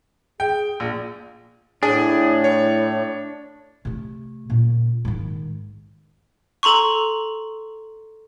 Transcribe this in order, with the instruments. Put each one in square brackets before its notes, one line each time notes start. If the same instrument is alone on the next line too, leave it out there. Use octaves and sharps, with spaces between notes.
[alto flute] G#4 [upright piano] G5
[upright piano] A#1
[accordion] A2 [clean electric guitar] D4 [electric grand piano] G#4 G#5
[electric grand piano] C#5
[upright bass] C3 A3
A#2 C#3
G#2 D#3
[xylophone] A4 A#5 C6 C#6